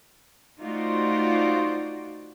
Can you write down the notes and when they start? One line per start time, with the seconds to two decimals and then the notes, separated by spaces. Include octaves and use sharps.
0.61 A3 D#4 F4 F#4 C5 D5